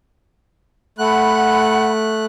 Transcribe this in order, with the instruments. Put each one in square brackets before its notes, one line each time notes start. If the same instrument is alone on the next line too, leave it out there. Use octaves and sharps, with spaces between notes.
[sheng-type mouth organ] A3 F#6 [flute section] F#5 B5